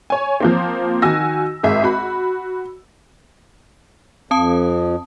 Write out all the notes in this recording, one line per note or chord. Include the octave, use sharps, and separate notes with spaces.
C#5 G#5
F3 A#3 C4
D#3 F#4 G#5 E6 A#6
G#1 G#4 E5
F#4 B5
F2 C4 A5 D#6